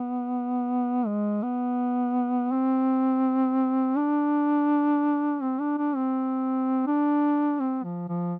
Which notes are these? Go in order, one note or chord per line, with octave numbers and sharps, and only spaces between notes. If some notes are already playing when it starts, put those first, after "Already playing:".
Already playing: B3
G#3
B3
C4
D4
C4
D4
D4
C4
D4
C4
F3
F3